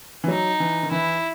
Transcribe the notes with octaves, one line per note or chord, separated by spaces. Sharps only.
E3
F#3 D#4
E3
D#3
E3 E4